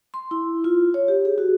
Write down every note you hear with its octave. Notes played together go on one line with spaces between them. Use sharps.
C6
E4
F4
C#5
G4
G#4
F#4